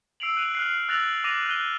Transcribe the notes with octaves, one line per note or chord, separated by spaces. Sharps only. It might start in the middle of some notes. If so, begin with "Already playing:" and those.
E6 C7 D7 F7 F#7
F#6 D#7 F7
F6 F#6 C7
E6 F#6 A6 A#6 F7 F#7
D6 A6 A#6 D#7 F7
F#6 D#7 G7